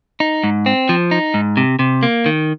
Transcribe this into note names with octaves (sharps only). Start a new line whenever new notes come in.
D#4
G#2
C4
F3
D#4
G#2
C3
C3
A#3
D#3